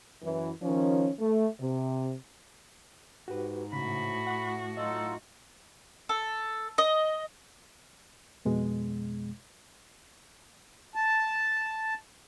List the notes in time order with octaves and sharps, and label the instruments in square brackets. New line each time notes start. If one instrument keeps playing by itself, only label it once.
[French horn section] F#2 E3
D#3 F3 C#4
A3
C3
[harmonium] G#2 [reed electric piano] F#4 G4 B4
[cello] A2 F#4 [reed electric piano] C#3 [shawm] B5
[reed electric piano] F#5 C#6
[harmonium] F#3 D#4 F4 [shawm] A4 [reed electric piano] D#5
[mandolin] A4
D#5
[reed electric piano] F2 B2 G#3
[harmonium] A5